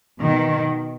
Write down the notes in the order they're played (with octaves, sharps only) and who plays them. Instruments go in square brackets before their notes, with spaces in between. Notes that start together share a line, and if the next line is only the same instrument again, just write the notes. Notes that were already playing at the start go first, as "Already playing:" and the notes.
[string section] B2 D#3